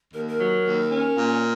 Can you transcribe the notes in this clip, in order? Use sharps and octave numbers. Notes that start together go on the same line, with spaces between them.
D#2 A#4
A#4
F#3
D#2
C#4
A#2